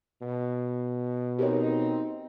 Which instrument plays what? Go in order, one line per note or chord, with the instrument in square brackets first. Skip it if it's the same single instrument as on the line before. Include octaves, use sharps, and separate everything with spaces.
[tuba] B2
[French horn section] C4 D#4 [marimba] G4 A#4 C#5